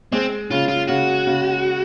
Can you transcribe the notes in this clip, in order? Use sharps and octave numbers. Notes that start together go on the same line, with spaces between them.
G#3 C4
C#3 F4
F4
C#3 F#4
C#3